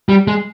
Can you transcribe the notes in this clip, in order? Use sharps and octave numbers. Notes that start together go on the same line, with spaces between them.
G3
G#3